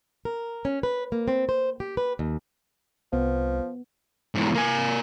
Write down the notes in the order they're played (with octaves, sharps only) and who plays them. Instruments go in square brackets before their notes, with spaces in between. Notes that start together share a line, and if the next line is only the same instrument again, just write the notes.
[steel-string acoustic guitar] A#4
C#4
B4
A#3
C4
C5
G4
B4
D#2
[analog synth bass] C2 [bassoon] F3 [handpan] B3
[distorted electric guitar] E2 G#2
A#3 G#5